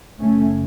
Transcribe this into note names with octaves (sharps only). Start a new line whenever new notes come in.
F#1 F#2 C#3 A3 C#4